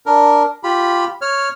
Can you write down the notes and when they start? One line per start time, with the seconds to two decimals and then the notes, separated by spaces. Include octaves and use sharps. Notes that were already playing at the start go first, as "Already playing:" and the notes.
0.06 D4 A#4
0.64 F4 G4 B5
1.21 C#5 F6